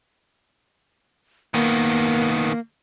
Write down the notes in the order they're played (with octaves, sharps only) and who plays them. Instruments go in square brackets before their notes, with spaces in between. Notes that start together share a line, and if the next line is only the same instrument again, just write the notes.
[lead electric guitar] D#3 B3 [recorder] A#3